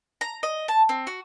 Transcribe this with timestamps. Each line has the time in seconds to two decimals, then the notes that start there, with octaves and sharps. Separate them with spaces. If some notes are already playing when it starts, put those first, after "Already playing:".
0.21 A#5
0.43 D#5
0.68 A5
0.89 C4
1.07 F#4